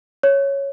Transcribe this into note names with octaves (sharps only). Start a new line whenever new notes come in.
C#5